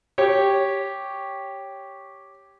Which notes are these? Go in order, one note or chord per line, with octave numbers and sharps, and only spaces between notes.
G4 C#5